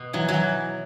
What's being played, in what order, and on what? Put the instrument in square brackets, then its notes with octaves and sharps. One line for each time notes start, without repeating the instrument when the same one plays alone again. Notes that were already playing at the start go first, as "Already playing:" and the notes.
Already playing: [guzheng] B2
E3 F#3
F#3
E3